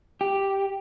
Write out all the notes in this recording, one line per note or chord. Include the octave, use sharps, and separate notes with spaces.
G4